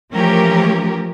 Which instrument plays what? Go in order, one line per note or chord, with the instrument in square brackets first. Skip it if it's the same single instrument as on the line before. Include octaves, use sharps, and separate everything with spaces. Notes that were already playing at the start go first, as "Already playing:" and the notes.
[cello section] E3 F3 A3 C#4 G4 A#4